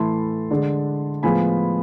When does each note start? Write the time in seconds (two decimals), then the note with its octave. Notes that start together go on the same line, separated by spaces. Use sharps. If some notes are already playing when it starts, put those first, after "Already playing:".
Already playing: A2 E3 A3 E4 A5 C6
0.51 D3 G#3 D4
1.23 A2 F3 G#3 B3 F4 G#5 B5